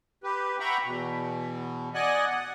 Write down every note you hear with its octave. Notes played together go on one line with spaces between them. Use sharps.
G4 B4
E5 F#5 G5 A#5 B5 C#6
E2 B2
D5 D#5 F#5 G#5 F#6
F#5